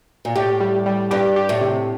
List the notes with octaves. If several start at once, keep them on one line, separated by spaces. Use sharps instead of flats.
A#2
A2 G4
G3
G3
G2 G4
G4
A2
C3